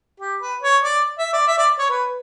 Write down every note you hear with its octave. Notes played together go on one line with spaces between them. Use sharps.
G4
B4
C#5
D5
E5
D5
E5
D5
C#5
B4